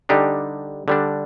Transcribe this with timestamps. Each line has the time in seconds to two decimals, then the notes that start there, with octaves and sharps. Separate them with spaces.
0.09 D3 G3 D4 D#4 G4
0.88 D3 G3 D4